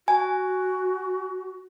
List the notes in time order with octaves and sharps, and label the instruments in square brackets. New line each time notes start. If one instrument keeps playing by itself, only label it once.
[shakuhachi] F#4 [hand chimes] G#5